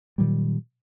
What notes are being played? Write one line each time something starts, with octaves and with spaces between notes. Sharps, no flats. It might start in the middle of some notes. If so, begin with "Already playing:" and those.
A#2 D#3 F#3 G3